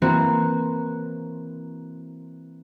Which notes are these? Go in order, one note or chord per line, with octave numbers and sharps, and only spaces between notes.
E3 A#3 C4 F#4